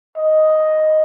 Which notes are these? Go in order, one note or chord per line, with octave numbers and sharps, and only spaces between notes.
D#5